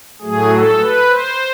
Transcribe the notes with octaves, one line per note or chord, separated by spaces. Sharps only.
A2 F#3 A3 G#4
A4
B4
C5